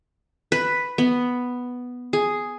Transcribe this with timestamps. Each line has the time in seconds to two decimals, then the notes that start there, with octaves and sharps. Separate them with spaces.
0.52 B4
0.98 B3
2.13 G#4